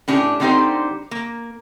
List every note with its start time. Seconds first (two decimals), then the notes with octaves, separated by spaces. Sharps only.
0.08 A2 C#4 D4 G4 G#4
0.40 D3 G3 C4 D#4 G4 C5
1.11 A#3